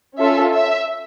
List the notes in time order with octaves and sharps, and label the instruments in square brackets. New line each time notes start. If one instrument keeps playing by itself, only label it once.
[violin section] C#4 F4 A4 E5
E5